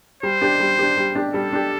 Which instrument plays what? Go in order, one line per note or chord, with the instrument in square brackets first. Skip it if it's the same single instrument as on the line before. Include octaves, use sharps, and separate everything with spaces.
[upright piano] G3 [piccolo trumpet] C5
[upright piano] D4 G4
G3
D4 G4
G3
D4 G4
[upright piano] G3 [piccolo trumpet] A4
[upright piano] D4 G4